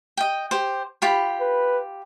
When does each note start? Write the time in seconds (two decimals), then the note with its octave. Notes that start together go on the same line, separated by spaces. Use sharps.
0.17 D#5 G5
0.51 G4 C5
1.02 F4 G4 B5
1.41 B4